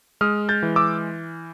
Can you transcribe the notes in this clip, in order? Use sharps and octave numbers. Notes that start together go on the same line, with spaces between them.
G#3 D#6 F6
G6 A6
E3
D6 E6